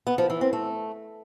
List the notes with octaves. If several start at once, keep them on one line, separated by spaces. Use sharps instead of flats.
B3
F3
E3
C4
A3